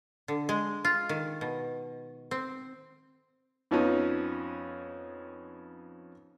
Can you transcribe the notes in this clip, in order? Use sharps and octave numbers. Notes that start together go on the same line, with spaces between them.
D3
G#3
F4
D#3
B2
C4
F2 F3 B3 C#4 D#4